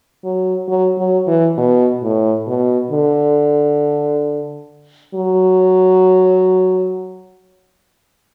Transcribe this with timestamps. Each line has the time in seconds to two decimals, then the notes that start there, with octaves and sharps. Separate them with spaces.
0.24 F#3
0.68 F#3
0.98 F#3
1.27 E3
1.58 B2
2.02 A2
2.47 B2
2.91 D3
5.14 F#3